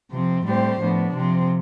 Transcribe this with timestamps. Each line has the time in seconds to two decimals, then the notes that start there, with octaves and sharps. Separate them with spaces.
0.12 C3 F3 C4
0.46 A2 G3 C4 G4 C5
0.80 A2 F3 B3 D4
1.14 C3 F3 C4